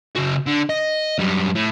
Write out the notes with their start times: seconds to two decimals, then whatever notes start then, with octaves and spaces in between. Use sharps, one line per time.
0.16 C#3 F#4
0.47 D3
0.70 D#5
1.19 F#2 G3
1.56 A2